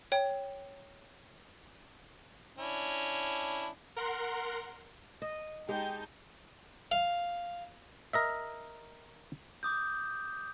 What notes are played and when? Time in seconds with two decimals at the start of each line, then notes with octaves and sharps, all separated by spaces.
0.12 C#5 G5
2.58 C#4 D4 E4
3.96 A#4 F#5 C6
5.22 D#5
5.69 G#3 D#4 G4 G5 A5 G6
6.92 F5
8.13 A#4 D#5 E5
9.63 D6 D#6 G6